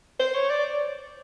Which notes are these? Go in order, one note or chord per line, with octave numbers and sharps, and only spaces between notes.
C5
C#5
D5